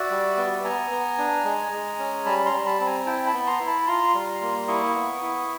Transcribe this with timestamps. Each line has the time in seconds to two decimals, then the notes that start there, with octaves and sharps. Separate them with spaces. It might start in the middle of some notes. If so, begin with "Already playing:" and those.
Already playing: F#4 D5 E5
0.10 G3
0.37 B3
0.64 B3 G#5 A#5
0.91 B3
1.18 D4
1.45 G#3
1.72 G#3
1.99 C#4
2.26 G3 A5 B5
2.46 A#5 C6
2.53 G3
2.66 A5 B5
2.80 C4
2.86 G#5 A#5
3.06 E4 G5 A5
3.26 A5 B5
3.34 B3
3.47 A#5 C6
3.61 E4
3.67 A5 B5
3.87 F4 A#5 C6
4.14 G3
4.42 A#3
4.68 E4 C#6 D#6
4.95 B3
5.22 E4